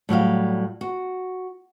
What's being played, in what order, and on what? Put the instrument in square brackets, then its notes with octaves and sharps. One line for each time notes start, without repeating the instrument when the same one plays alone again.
[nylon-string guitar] A2 F#3 G3 F5
F#4